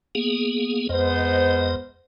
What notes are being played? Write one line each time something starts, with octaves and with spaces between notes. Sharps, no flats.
A#3 B3 G#4
F2 G#3 B3 C5 D#5